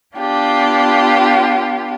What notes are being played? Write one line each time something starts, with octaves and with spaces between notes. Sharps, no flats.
B3 D4 F4 G4